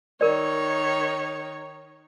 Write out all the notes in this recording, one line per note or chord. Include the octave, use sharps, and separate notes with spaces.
D#3 A#4 C#5 D5